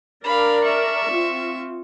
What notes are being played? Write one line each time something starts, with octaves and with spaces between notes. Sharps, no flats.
D4 A#4 D5 F5 B5
E5 C#6
C4 F4